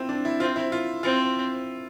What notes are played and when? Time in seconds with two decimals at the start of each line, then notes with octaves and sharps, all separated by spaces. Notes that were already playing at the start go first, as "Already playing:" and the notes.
Already playing: C4 E4 F4
0.09 D4
0.25 E4
0.40 C4 F4
0.56 E4
0.72 F4
1.03 C4 F4